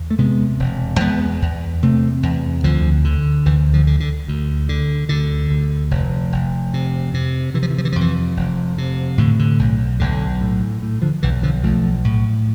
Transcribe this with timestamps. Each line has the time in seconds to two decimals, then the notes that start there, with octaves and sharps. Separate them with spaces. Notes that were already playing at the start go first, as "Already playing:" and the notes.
Already playing: E2
0.11 A3
0.19 C3 G#3 B3
0.59 E1
1.00 E2 G#3 B3
1.42 E2
1.82 C3 A3 C4
2.23 E2
2.64 D2 D3 F3
3.05 D3
3.46 D2 E3
3.73 D3 F3
3.87 D3
4.00 D3
4.28 D2
4.69 D3
5.09 D2 D3
5.50 D2
5.91 F1
6.32 F1
6.74 C3
7.14 C3
7.54 C3 E3
7.63 F3
7.70 E3
7.78 F3
7.85 E3
7.92 F3
7.96 F2
8.01 E3
8.37 F1
8.78 C3
9.18 A2 D3
9.39 D3
9.59 B1
10.00 B1 D3
10.41 A2
10.82 A2
11.02 D3 F3
11.23 B1 E3
11.43 D3 F3
11.63 B1 F3 A3
12.04 A2